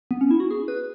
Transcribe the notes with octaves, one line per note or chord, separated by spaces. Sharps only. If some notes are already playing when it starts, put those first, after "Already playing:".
B3
C#4
E4
F#4
G#4
B4